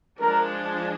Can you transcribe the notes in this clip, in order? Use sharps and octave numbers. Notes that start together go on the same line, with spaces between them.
F3 G#3 D4 A#4